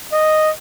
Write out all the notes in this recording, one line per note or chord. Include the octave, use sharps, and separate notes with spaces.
D#5